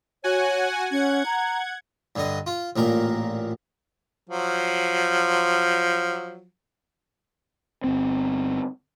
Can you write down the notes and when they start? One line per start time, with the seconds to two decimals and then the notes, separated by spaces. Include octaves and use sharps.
0.24 F#4 C#5 F#5 G#5
0.91 C#4 F#5 G#6
1.26 A#5
2.16 G2 D3 D#5
2.46 F4
2.76 A1 A#2 A#4
4.29 F3 F#3
7.84 G1 C4